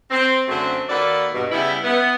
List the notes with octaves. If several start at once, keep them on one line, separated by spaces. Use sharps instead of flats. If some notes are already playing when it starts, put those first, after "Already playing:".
C4
F#2 D3 F#3 A3 C4
D#3 A#3 F#4 A4 B4 D5
G2 B2
C#3 G3 B3 E4
B3 E4